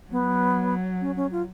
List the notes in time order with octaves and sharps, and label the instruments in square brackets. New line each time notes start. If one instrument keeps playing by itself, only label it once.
[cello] F#3 [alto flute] B3
[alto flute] C#4
C#4
F4